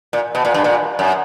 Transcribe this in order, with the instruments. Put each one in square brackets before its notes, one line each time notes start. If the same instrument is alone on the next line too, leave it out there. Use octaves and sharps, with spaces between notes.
[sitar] A#2
B2
A#2
G2
A#2
F#2